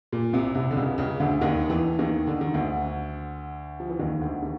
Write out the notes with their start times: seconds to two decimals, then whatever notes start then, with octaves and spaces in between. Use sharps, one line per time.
0.12 A#2
0.33 C2 C3
0.55 C2 C3
0.71 D3
0.76 C#2 C#3
0.98 C#2 C#3
1.20 D2 D3
1.41 D#2 D#3
1.69 E2 E3
1.99 D#2 D#3
2.27 D3
2.41 D#3
2.54 D2 D3
3.80 F3
3.89 E3
3.99 D#2 D#3
4.20 D2 D3
4.42 D#3